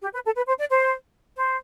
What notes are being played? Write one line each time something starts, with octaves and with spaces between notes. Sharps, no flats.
G4
B4
A4
B4
C5
D5
C5
C5